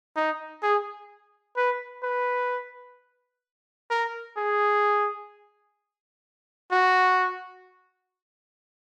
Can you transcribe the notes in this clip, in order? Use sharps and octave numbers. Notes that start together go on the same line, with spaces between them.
D#4
G#4
B4
B4
A#4
G#4
F#4